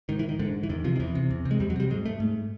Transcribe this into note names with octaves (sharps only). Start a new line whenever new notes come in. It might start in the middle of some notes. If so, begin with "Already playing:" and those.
G#2 D#3
E3
D#3
G#2 D3
E3
E2 D#3
C3 F3
D#3
E2 E3
C3
E2
C3
G#3
E2 G3
F#3
C3 G3
G#2 G#3
A3
G#2